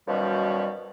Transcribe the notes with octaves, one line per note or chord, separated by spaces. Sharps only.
F#2 B2 D#3 F3 G3